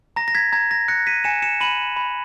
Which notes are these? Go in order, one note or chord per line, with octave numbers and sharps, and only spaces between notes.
A#5 A#6
A#6
G#6 B6
A#5 G#6
A#6
F#6 A#6 C#7
B6 D#7
G#5 C#7 E7
C#7 E7
B5 D#7 F#7
B5